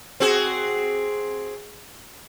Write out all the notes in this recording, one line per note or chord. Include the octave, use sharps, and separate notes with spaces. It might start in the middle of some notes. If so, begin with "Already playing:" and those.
C4 F#4 G#4